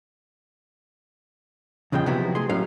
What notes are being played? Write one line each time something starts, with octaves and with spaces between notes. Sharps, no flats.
E2 C#3 F3 G#3 G5
C3 F3 F#3 B3 E4 F#4
A3 G#4 C6
A2 F#3 C#4 F5